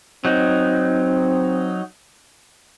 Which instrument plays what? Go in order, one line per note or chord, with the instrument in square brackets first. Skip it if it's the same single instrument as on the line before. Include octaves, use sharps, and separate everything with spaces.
[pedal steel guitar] F#3 D#4 [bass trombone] C4